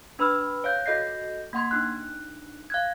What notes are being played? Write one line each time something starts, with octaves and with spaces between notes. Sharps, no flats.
D4 B4 B5 E6 F6
C#5 F5 G6
F#4 A4 D#5 G6 A#6 C7
A#3 F#5 C6 G#6
D4 D#4 F#6
F5 F#6 G#6